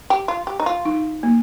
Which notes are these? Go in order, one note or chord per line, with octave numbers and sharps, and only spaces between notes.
G4
F4
G4
D#4
F4
D#4
A#3